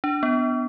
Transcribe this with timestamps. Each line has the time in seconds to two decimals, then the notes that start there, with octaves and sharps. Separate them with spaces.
0.04 D4
0.23 B3